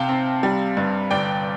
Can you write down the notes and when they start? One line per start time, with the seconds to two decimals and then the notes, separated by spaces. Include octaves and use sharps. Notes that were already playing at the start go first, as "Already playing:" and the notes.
Already playing: C3 F5 G5 A5
0.09 C4
0.43 G3
0.77 G2
1.11 G1 D5 G5